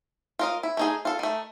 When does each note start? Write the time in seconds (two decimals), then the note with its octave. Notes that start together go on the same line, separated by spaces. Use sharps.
0.39 F4 A#4 D#5
0.63 E4
0.77 A3 D#4 G#4
1.05 F4 A4
1.19 D#3 A3